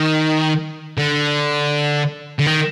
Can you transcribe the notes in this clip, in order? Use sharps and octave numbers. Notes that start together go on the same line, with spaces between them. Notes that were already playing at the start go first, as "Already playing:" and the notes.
Already playing: D#3
D3
D3
D#3